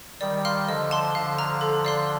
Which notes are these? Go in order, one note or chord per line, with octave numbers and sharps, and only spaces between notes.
D#3 G3 D5
F5 C6 F6
D3 F3 D#5
A5 C6
D3 F3 F5
A#5 F6
A4
D5 F5 C6